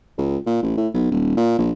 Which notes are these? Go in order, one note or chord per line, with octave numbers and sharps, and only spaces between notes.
C#2
A#2
A1
A2
B1
D#1
A#2
A#1